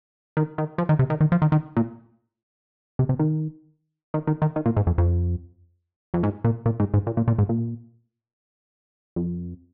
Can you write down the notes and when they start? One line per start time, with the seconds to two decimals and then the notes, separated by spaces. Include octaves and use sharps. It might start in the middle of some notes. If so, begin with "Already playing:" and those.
0.37 D#3
0.58 D#3
0.78 F3
0.89 D#3
0.99 C3
1.10 D#3
1.21 D#3
1.32 F3
1.42 D#3
1.52 D#3
1.77 A#2
2.99 C3
3.09 C3
3.19 D#3
4.14 D#3
4.27 D#3
4.42 D#3
4.56 D#3
4.66 A#2
4.77 G#2
4.87 F2
4.98 F2
6.14 F2
6.23 G#2
6.44 A#2
6.66 A#2
6.80 G#2
6.94 G#2
7.07 A#2
7.17 A#2
7.28 A#2
7.38 G#2
7.49 A#2
9.16 F2